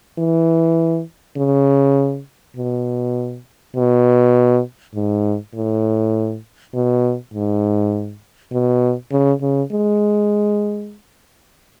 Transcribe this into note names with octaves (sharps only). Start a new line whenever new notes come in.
E3
C#3
B2
B2
G#2
A2
B2
G#2
B2
C#3
C#3
G#3